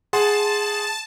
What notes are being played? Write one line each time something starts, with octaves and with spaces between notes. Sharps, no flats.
G#4 F#5 A5 C6